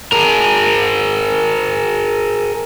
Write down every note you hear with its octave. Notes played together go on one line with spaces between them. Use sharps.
G#4 A#4